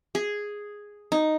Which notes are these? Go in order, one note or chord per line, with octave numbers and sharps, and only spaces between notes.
G#4
D#4